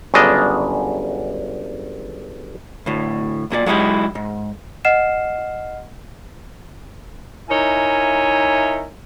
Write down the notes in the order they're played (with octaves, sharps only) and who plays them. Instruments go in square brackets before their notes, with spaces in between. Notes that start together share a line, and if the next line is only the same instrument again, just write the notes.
[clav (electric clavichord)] G1 F#2 C#3 D4 D#5
[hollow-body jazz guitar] D2 A2
B1 A#2 G#4 D5
F#3 G#3 D#4 E4 G4
G#2
[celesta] D#5 F#5 F6 C7 E7
[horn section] D#4 E4 A#4 C#5 E5 G#5